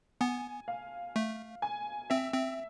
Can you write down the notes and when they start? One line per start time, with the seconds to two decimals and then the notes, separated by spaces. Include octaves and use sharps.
0.21 B3 G#5
0.68 F5
1.16 A3
1.62 G#5
2.10 C4 E5
2.34 C4